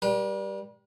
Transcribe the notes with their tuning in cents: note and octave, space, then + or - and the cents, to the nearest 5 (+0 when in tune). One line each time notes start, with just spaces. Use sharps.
G3 +0 B4 -45